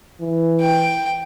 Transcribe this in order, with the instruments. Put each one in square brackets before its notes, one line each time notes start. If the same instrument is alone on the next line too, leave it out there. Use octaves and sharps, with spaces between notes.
[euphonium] E3
[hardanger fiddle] G5